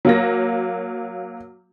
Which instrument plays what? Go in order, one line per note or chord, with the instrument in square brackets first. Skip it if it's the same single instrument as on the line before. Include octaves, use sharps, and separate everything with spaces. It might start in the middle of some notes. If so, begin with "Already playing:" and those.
[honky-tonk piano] F#3 A#3 A#6